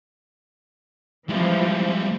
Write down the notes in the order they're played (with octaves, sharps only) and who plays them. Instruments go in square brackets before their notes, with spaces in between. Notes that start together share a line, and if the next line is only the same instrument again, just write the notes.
[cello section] E3 F3 C4 [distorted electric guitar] G3 G#3